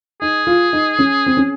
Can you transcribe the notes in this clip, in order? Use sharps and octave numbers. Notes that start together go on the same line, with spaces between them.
D#4 G#4
F4
D#4
C#4
C4
C#4